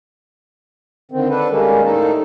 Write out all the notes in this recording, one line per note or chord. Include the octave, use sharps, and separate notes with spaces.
D3 D#3 C4
D4 A4 B4
D#3 G3 G#3 A#3 C#4
A2 D#3 A3 D#4 A4